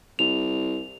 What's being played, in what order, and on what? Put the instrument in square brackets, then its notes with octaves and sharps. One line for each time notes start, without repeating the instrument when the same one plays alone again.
[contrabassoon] C2 [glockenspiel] F7